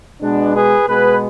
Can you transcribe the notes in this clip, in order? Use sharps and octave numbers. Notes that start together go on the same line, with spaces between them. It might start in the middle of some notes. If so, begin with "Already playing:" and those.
B2 G#3 B3 D4
G#4 B4
B2 G#3 B3 G#4 B4